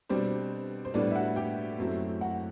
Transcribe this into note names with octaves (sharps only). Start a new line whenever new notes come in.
B2 G3 C4 D4 C5
C5
A2 G3 B3 D4 D5
E5
F#4 F#5
G4 G5
F#2 F#3 A3 C4 E4
F#4 F#5